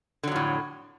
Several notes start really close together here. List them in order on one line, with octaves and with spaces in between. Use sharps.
D3 F#3 F2 A2